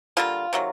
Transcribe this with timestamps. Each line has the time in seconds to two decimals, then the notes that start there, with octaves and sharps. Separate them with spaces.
0.17 D3 G3 A#3 F4
0.53 C3 D#3 F#3